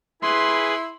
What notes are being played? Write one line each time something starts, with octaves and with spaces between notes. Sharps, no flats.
E4 G#4 B4 C6